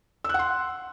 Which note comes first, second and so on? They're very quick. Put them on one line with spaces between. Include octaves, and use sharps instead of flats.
E6 F#6 F#5 C6